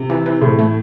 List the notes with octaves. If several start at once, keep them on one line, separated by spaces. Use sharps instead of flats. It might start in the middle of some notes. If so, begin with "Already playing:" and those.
Already playing: C3
E3
E3
A2 C3
A3